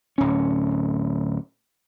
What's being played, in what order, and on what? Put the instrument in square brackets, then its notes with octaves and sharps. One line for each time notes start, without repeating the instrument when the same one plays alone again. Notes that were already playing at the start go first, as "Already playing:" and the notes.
[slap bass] D1 C#4